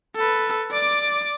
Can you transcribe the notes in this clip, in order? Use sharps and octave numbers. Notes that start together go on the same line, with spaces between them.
A4 B4
D5 D6